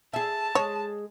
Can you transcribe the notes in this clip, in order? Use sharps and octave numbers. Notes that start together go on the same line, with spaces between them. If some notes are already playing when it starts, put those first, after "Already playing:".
G#4 E5 A5
G#3 G#4 C#5